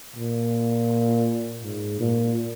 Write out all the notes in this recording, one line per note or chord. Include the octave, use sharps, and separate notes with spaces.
A#2
G#2
A#2